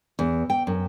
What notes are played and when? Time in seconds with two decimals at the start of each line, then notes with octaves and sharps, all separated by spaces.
0.19 E2
0.50 G5
0.67 F#2